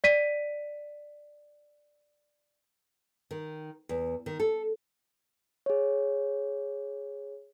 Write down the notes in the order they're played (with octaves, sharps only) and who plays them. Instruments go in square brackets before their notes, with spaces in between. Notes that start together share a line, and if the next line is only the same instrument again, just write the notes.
[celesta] D5 B6 D#7
[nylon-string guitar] D#3
E2
D#3
A4
[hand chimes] G#4 C#5